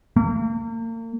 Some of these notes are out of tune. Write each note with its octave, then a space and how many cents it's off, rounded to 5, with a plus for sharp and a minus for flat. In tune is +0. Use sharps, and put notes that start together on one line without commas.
A#3 -40